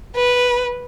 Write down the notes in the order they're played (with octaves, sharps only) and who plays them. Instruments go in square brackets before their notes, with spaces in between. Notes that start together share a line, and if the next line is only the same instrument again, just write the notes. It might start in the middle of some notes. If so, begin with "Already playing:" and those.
[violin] B4